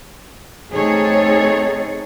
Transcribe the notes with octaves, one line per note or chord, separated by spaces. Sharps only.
A3 C4 D#4 G#4 A4 C#5